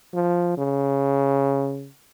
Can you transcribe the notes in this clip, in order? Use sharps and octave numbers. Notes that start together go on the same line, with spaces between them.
F3
C#3